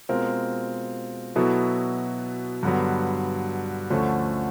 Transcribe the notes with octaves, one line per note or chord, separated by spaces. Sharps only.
B2 G#3 C4 F4 A#4
B2 F#3 B3 E4 A4
G2 D3 F#3 B3
D2 D3 F3 A3 C#4